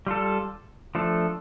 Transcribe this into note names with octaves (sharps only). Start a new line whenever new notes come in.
G3 F4 A4
F3 A3 D4 A4